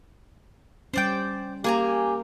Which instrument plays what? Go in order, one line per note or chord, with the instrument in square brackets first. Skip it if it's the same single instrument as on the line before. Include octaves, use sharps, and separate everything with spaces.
[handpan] G3 C#4 [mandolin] C5 D5 G5
[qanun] A#3 [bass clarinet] G4 [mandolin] G#4 G#5 A#5